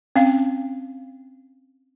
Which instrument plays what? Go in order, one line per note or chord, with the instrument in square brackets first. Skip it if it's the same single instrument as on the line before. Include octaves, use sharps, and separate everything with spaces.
[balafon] C4 C#4 F5